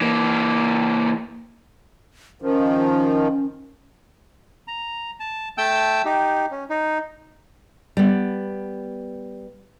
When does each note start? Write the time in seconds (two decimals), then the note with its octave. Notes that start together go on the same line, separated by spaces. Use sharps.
0.01 E3 A#3
2.42 D#3 F3 C#4
4.68 A#5
5.20 A5
5.58 A3 G5 A5 E6 G6
6.05 D#4 G4
6.51 C#4
6.70 D#4
7.97 G3 B3